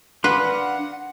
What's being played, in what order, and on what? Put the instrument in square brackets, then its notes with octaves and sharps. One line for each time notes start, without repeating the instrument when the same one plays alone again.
[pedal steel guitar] D4 F5 C6 [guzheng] B4 [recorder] F#5